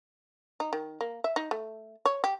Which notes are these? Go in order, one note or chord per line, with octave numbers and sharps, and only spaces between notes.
D#4
D#3
A#3
E5
D#4
A3
C#5
G4